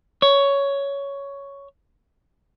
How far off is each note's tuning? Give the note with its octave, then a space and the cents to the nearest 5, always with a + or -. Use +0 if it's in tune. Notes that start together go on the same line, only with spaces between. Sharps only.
C#5 +10